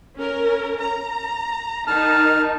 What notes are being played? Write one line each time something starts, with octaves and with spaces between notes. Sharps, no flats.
C#4 A#4
A#5
D#3 D#4 A5 F6